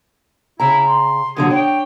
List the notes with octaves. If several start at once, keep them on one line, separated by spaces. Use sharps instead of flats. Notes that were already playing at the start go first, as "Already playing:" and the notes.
C#3 E4 A#5
C6
A#2 D3 F#3 G#4
D4 C#5 G5